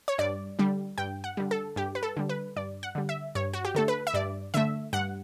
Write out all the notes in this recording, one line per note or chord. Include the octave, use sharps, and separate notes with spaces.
C#5
G2 D5
D3 G3
G2 G5
F#5
D3 G3
A4
G2 G4
B4
A4
D3 G3
B4
G2 D5
F#5
D3 G3
E5
G2 C#5
F#4
G4
D3 A3 A4
B4
E5
G2 D5
D3 A3 E5
G2 F#5